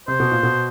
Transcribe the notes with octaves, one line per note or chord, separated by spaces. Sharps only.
C3 C5
B2
A#2
B2